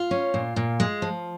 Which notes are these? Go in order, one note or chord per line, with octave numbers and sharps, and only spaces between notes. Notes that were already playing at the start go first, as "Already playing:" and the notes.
Already playing: F4
C#4
A#2
A#2
G#3
F3